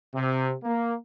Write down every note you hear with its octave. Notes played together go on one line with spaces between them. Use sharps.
C3
A#3